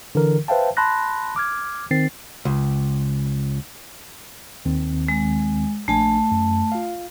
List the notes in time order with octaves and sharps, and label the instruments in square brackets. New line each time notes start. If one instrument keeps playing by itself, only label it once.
[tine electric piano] D3 E3 A#4
B4 C5 E5 F5 G5 A5
A5 B5 C6 F#6 A#6
D6 F6 G#6
D#3 C4 A6 C7
[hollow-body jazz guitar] C#2
[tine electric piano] D#2 D#3 C4
[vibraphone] G#3
[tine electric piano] A#1 D4 G#5 [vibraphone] A3 A5
[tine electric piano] F#2
F4 F5